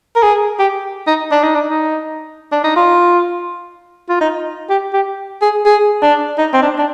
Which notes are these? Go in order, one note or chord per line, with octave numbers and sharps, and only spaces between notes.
A#4
G#4
G4
D#4
D4
D#4
D4
D#4
D4
D#4
F4
F4
D#4
G4
G4
G#4
G#4
D4
D#4
C4
D4
D4